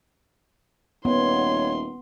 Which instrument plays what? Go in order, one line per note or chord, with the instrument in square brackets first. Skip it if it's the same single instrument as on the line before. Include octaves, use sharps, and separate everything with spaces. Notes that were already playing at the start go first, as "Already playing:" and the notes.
[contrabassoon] D#1 [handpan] B3 [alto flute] C#5 [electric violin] C6